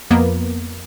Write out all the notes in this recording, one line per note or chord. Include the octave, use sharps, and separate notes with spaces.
F2 A#3 B3